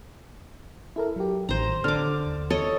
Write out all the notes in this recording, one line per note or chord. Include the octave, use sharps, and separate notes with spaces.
E4 A4 A#4
F#3 G4
A1 D#3 C5 A#5
D3 D6 F6
D#2
A4 C#5 D#5